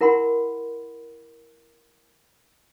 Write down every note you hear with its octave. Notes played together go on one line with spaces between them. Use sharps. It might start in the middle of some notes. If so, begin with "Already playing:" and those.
E4 A#4 F#5 B5 C6